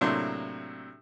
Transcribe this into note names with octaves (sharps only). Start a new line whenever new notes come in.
A2 C3 F#3 A#3 D4 C6